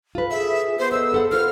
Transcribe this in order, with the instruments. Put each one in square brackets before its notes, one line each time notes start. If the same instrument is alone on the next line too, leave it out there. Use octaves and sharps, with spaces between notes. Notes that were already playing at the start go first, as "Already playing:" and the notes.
[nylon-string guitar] F4 A4 B4
[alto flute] G#4 [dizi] E5
[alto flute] B3 [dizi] C5
[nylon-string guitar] A4 D#5 [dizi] E6
[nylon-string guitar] G#4 A4 F#5
[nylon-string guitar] F4 A#4 [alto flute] C5 [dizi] F6